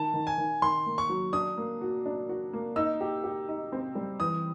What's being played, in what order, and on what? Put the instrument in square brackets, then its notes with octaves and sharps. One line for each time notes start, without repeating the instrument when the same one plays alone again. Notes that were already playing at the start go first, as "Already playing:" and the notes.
Already playing: [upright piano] D#3 [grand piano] A5
[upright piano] D#3
[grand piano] G#5
[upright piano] D#3
[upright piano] D#3 [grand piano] C6
[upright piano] A#3
[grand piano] C#6
[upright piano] F#3
[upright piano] D4 [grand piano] D#6
[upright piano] A#3
F#4
D4
F#4
A#3
[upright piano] D#4 [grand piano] E6
[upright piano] G4
G4
D#4
C4
G3
[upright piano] E3 [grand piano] D#6